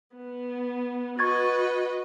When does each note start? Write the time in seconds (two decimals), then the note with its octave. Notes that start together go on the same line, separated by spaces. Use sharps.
0.15 B3
1.19 F#4 B4 D#5 C#6 G#6 A6